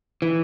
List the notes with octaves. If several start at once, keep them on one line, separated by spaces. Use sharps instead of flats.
E3